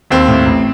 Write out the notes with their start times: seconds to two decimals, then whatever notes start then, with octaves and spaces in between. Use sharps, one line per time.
0.10 D#2 C4
0.28 A2
0.46 A1